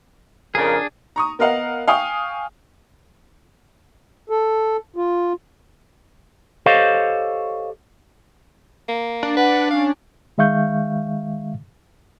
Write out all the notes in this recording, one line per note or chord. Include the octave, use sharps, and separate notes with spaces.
F2 C#3 D4 G#4 A#4
A#5 C#6 D#6
B3 A#4 D#5 F5 F#5
F5 G5 G#5 C#6 D#6
A4
F4
G4 A4 C5 C#5 D#5 F5
A#3
D4
B4 F#5
C#4 F5
D#3 G#3 E5 F5 C#6 G6